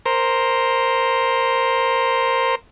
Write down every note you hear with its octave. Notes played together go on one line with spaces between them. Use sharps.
A#4 C5